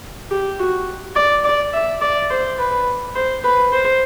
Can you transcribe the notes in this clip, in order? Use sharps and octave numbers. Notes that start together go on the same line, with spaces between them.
G4
F#4
D5
D5
E5
D5
C5
B4
C5
B4
C5